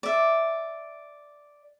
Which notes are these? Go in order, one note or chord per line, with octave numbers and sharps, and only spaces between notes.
D5 E5